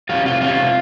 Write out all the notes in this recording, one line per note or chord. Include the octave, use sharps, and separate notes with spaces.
G3 C#4 F4
C3 F4
G3 C#4 F4
C3